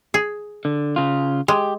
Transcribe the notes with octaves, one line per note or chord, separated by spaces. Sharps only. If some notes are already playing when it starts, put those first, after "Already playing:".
G#4
D3
C#3 F4
G#3 G4